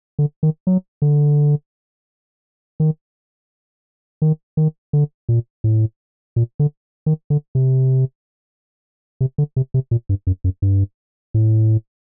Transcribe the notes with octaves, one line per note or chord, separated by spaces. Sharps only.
D3
D#3
F#3
D3
D#3
D#3
D#3
D3
A#2
A2
A#2
D3
D#3
D3
C3
C3
D3
C3
C3
A#2
G2
F#2
F#2
G2
A2